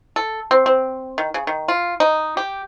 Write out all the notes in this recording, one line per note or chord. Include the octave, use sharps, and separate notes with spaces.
A4
C4
C4
D#3
C#3
D#3
F4
D#4
G4